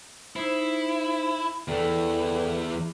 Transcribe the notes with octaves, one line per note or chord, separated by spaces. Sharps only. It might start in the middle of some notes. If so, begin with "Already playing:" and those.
D#4 E4 C5
E2 E3 A4 D5 G5